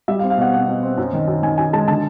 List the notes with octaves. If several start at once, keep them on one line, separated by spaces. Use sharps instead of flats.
G3 E5
F5
C4
F5
B2 F#5
C4 F#5
B2
C4
F#2
D#3
F#2
D#3 G#5
F#2 G#5
G#3 A5
D3 A5